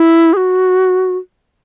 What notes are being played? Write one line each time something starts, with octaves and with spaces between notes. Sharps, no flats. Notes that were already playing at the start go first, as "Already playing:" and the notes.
Already playing: E4
G#4
F#4